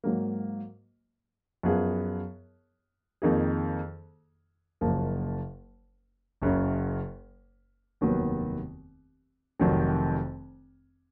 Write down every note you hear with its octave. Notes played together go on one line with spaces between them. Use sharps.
G#2 F#3 A#3
F#2 F3 B3 F4 G#4
F2 D#3 A#3 D#4 G#4
F#1 F#2 F3 A#3
F#1 F#2 C#3
F1 D#2 D#3 F#3 B3
F1 F2 D#3 F#3